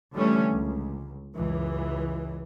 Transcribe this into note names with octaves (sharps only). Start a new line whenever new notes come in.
D3 E3 G3 A3 C#4
C#2
C#2 F#2 E3